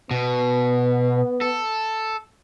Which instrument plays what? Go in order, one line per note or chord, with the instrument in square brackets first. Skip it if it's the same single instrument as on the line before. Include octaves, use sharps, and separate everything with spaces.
[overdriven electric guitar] B2 [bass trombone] B3
[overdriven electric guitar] A4